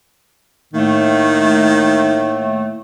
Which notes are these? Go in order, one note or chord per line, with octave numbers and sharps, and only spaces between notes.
A2 D#3 A3 A#3